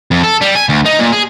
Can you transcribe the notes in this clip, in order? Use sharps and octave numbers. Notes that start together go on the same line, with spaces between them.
F2
A4
G3
G#5
D2
D#4
A#2
G#4